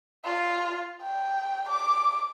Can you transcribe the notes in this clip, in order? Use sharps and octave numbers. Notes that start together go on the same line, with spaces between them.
F4
G5
D6